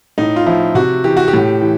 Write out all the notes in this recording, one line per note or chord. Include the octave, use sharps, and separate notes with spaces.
A2 D#4
F4
F3 E4
C3 F#4
E3 G4
F#4
G4
A2
E3